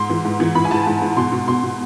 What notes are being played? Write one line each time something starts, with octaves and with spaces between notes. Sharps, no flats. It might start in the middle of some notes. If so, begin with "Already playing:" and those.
Already playing: G#2 C6
E3
G#2
E3
E3 B5
G#5
G#2 A5
G#2
G#2
B2 C6
B2
B2 C6
B2